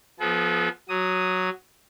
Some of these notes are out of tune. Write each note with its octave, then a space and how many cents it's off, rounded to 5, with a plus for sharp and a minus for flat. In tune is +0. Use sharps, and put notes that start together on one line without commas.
F3 +5 B3 +0 A4 -45
F#3 +0 D#6 +0